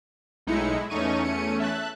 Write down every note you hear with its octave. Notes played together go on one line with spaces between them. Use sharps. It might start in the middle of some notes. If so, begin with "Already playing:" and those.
B1 A2 G#3 D#4 E4 C#7
E2 A3 C#4 D#4 C#6 D#7
C#7 D#7
E5 A5 F#6